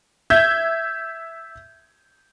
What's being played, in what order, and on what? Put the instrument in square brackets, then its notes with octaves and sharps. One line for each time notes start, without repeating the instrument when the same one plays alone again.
[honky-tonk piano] E5 G6 G#6